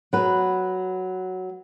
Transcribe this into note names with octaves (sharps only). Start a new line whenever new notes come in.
F#3 B4